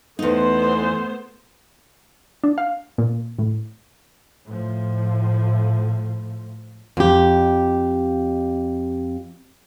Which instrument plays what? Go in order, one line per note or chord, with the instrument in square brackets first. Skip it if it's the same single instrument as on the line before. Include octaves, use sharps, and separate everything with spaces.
[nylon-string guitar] E2 D#4 [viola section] A3 B3 C5
[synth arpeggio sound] D4
F5
A#2
A2
[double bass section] A2 F3
[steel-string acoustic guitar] F2 G4